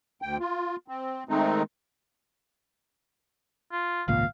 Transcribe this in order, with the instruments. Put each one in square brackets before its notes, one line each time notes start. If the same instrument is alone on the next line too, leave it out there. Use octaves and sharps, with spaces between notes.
[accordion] D2 G5
F4
C4
D#3 G#3 A3 C4 D#4
[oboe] F4
[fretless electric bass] G#1 C#2 A#2 [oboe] F5